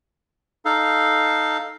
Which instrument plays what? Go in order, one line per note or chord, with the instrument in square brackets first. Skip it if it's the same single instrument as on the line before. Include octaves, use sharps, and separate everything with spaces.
[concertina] D#4 A4 F5